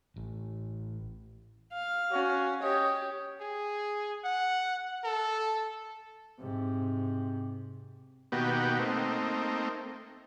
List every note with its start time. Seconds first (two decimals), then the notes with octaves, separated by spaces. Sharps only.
0.16 A1
1.73 F5
2.12 C#4 F#4
2.62 G4 C#5 D#5
3.40 G#4
4.24 F#5
5.04 A4
6.39 G#2 C3
8.32 B2 D#3 A#3 B3 F#4 G4
8.79 A3 A#3 C4 D#4